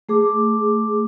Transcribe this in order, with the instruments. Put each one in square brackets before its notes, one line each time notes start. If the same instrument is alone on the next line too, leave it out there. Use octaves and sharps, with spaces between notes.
[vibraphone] A3 G#4 D6